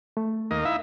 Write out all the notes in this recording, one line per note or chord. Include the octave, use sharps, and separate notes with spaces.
A3
D#2 A#3 D#5
D#4 E4 E5 F5